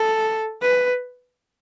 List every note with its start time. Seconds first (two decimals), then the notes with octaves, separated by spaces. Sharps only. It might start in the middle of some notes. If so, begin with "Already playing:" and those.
Already playing: A4
0.62 B4